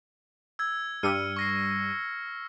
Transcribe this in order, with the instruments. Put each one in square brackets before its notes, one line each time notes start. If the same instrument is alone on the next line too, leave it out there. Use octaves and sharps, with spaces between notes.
[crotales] E6 G#6
[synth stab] G2 G3 D#7 [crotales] E6 F6 C#7
[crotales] C#6 A#6 C7